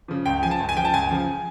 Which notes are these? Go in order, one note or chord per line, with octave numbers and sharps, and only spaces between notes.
C#3 F3
C#2 G5
C#3 F3 G#5
A5
C#2
G#5
C#3 F3 G5
A5
C#2 G#5
C#3 F3